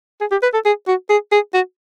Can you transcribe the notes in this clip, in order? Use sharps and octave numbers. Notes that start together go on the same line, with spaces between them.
G#4
G4
B4
A4
G#4
F#4
G#4
G#4
F#4